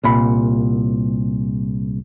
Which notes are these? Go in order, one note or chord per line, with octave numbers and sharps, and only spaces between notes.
C2 A#2 B5